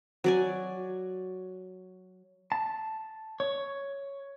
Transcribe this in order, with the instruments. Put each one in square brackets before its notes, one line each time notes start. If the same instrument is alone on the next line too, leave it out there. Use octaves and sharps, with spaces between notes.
[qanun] F#3 D5 G#5
[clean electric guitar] A5
C#5